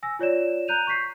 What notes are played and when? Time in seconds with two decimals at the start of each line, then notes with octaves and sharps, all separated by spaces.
0.03 G#5 E6 A#6
0.19 F4 C#5 D5 E7
0.68 A#5 F#6 G6 D#7 F7
0.87 C#6 G6 B6 C7